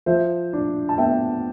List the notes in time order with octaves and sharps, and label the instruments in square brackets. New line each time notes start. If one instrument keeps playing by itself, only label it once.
[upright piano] F3 C5 E5
D4
A5
B3 E5 G5